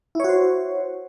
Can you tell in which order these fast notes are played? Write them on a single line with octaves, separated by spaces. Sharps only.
E4 C#5 F#4 C5